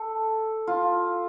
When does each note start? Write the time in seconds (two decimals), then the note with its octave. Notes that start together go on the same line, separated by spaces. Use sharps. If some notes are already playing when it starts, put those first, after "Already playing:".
Already playing: A4
0.67 F4